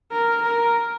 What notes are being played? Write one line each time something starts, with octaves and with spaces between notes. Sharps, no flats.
A#4
A#4